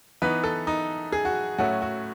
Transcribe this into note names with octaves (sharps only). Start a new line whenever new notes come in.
E3 B3 D#4 B4
A4
D#4
G#4
F#4
A2 F#3 A3 C#4 F#4
F#4